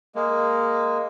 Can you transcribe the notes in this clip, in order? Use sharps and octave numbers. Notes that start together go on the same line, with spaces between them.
G#3 A#3